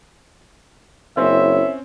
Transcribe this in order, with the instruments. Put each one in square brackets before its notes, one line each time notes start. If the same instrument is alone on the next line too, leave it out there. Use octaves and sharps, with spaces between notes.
[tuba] F#1 [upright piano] C4 C#4 C5 [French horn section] E4 A#4 C#5 [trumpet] E5